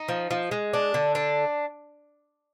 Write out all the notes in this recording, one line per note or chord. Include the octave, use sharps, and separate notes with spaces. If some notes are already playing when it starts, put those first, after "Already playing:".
Already playing: D#4 D#5
F3
F3
G#3
D4
D3
D4